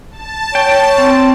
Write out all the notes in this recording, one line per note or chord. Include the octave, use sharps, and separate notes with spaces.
A5
C#5 G5
C4